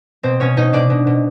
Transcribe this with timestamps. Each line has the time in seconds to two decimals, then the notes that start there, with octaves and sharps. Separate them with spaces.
0.23 B2 C4 C5
0.40 B2 C#4 C#5
0.57 B2 D#4 D#5
0.73 B2 D4 D5
0.90 B2
1.07 B2